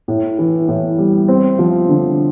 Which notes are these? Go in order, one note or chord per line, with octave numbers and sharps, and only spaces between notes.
A2
E3
A2
G3
C4
F3
D3